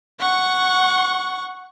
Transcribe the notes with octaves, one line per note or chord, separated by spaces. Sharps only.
F#5 C#6